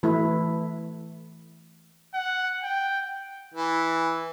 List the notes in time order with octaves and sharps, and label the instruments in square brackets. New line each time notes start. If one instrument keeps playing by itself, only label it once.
[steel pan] E3 A3 E4
[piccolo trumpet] F#5
G5
[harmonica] E3